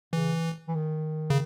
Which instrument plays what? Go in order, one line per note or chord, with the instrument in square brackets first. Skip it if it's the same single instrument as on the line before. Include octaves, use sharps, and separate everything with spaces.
[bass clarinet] C#3 [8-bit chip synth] E3
[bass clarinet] E3
D#3
[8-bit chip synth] C#3